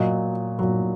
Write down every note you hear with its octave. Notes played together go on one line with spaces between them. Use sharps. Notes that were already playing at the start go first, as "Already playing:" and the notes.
Already playing: A#2 F#3 D#5
A#2 F#3